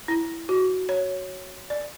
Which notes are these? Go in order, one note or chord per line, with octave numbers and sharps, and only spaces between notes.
E4
F#4
C#5
D5